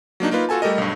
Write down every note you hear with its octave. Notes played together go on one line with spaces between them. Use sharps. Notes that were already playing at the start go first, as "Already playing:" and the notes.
F#3 A#3 D4 D#4
A#3 D#4 F4 B4
F4 F#4 A4 G#5 A5
G3 A3 G4 A4 A#4 D#5
B1 G2